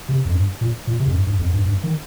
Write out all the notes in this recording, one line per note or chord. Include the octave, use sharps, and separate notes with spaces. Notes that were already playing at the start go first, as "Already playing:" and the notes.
C3
F2
G2
A#2
A#2
C3
F2
G2
G2
F2
G2
G2
D#3